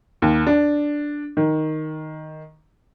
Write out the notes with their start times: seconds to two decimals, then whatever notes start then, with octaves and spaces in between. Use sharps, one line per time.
0.22 D#2
0.47 D4
1.37 D#3